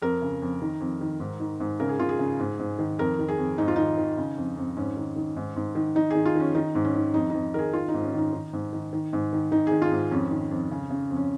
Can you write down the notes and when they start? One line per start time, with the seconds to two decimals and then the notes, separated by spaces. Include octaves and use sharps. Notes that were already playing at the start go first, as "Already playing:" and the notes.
0.02 F2 A#4
0.22 C#3
0.42 F2
0.62 D#3
0.80 F2
1.01 D#3
1.20 G#2
1.40 D#3
1.60 G#2
1.80 C#3 A#4
1.89 G#4
1.99 C#3 F4
2.09 G#4
2.19 C#3
2.39 G#2
2.59 G#2
2.79 D#3
2.99 F2 A#4
3.19 D#3
3.28 G#4
3.38 F2
3.58 G#2 D#4
3.68 F4
3.76 D#3 D#4
3.97 D#3
4.18 C#3
4.37 F2
4.57 F2
4.77 G#2 C#4
4.97 D#3
5.16 D#3
5.36 G#2
5.56 G#2
5.75 D#3
5.95 D#3 D#4
6.10 D#3 G#4
6.25 F4
6.35 D#3 C#4
6.55 D#3 D#4
6.75 G#2
6.85 C#4
6.95 D#3
7.14 F2 D#4
7.30 F2 D#4
7.54 D#3 G#4 A#4
7.73 D#3 F4
7.88 D#4
7.94 G#2
8.03 C#4
8.13 D#3 D#4
8.33 D#3
8.53 G#2
8.73 D#3
8.93 D#3
9.13 G#2
9.33 D#3
9.52 D#3 D#4
9.67 D#3 G#4
9.82 F4
9.91 G#2
10.11 F2 C#4
10.31 D#3
10.51 F2
10.71 C#3
10.90 C#3
11.11 F2
11.17 C#4